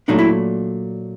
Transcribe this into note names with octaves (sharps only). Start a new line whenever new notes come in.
A#2 F#3 A3 D4 D#4
E4